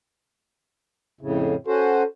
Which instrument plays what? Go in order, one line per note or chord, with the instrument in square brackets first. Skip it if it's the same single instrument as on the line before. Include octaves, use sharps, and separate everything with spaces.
[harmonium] F2 A2 C#3
[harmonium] C#4 F#4 C5 [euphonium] A4